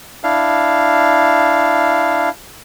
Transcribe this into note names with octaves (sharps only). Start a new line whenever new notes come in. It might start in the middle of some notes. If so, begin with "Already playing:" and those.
D4 E4 F5